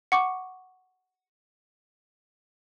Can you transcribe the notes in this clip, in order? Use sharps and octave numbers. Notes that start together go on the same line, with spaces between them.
F#5 C#6 D6